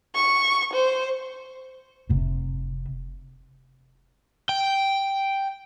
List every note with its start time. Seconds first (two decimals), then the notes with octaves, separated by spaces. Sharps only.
0.15 C#6
0.73 C5
2.09 F1 C3
4.49 G5